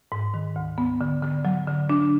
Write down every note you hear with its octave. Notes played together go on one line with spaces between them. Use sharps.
G#2
D#3
D2
B3
D3
D3
F#3
D3
D4